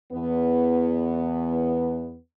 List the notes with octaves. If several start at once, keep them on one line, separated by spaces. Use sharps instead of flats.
E2 B3